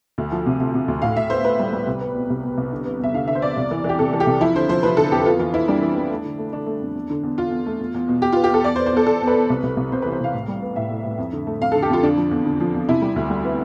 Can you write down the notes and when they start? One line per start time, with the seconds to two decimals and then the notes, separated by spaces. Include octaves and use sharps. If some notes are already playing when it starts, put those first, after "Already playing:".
0.18 D2
0.32 F3
0.46 C3
0.60 C3
0.74 C3
0.88 D2
1.02 A2 F5
1.17 A2 E5
1.30 B3 C5
1.45 B3 B4
1.59 G3
1.73 G3
1.87 C2
2.01 B3
2.15 B2
2.30 C2
2.44 B2
2.57 C2
2.72 D3
2.86 B3
2.99 E2 E5
3.14 D3 F5
3.28 D3 E5
3.35 C5
3.42 E2 D5
3.57 C2
3.71 E3
3.84 E3 G4
3.99 C3 A4
4.13 E3
4.20 G4
4.26 C2
4.40 F3 E4
4.55 D3 C5
4.69 F3 C5
4.83 F3 B4
4.97 D3 A4
5.12 F2 G4
5.25 B3 F4
5.39 E3 F4
5.53 B3 E4
5.68 G3 D4
5.82 E3
5.97 E3
6.10 A3
6.25 D3
6.38 A3
6.53 D3 D4
6.66 A3
6.82 F2
6.95 E2
7.10 D3
7.23 E2
7.38 E2 F4
7.51 E2
7.66 A3
7.80 E2
7.94 E2
8.08 B2
8.22 B2 G4
8.32 B3 F4
8.44 G4
8.50 E2 A4
8.64 E2 D5
8.76 C5
8.79 B3
8.86 C5
8.93 E2 A4
9.06 E2 A4
9.22 E2
9.27 B4
9.36 E2
9.50 C2
9.63 C2
9.77 C2
9.92 C3 C5
10.02 E3 B4
10.12 C5
10.20 C2 F5
10.33 A2
10.48 G3
10.62 B3
10.76 A2 E5
10.91 A2
11.05 A2
11.18 F2
11.33 D3
11.47 A3
11.61 F2 F5
11.72 D3 A4
11.82 G4
11.90 F2 F4
12.03 D3 D4
12.17 F3
12.31 E2
12.46 D3
12.60 F3
12.74 E2
12.89 C3 E4
13.02 G3
13.16 D2
13.30 G3
13.45 B3